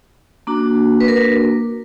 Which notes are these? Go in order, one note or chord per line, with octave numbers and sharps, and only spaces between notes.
A#3 D4 F#4
B4
A#4